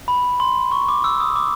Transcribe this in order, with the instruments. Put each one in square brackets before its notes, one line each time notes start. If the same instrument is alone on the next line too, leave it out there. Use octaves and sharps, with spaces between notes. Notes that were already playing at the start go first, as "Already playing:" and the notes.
[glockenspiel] B5
C6
C#6
D6
E6
D#6
D6